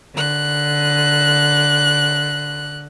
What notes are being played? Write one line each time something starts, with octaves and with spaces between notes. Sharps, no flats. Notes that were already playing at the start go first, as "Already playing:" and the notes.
D3 F#6